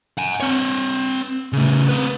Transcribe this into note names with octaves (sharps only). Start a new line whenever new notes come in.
F#5 G#5
C4 C#5
C#3 A3
C4 B4